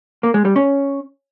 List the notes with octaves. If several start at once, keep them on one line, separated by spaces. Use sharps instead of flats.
A#3
G#3
G3
C#4